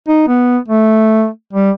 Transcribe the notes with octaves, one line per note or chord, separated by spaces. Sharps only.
D#4
B3
A3
G3